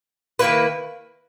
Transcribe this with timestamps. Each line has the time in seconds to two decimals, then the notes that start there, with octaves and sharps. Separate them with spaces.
0.39 D#3 A#3 E4 B4